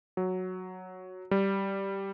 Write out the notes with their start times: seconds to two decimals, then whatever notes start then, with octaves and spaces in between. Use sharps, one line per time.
0.17 F#3
1.31 G3